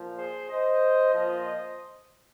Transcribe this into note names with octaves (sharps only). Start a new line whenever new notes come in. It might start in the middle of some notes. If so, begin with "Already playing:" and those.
Already playing: A#2 F3
G#4 C5
C5 D#5
A#2 F3 C5 D#5